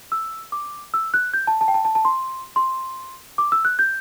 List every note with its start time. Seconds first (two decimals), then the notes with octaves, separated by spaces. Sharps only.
0.12 E6
0.52 D6
0.94 E6
1.14 F#6
1.34 G6
1.47 A5
1.61 A5
1.68 G5
1.74 A5
1.85 A5
1.95 A5
2.05 C6
2.56 C6
3.38 D6
3.52 E6
3.65 F#6
3.79 G6